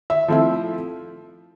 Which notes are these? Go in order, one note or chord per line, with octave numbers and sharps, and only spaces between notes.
E5
F3 A3 C4 E4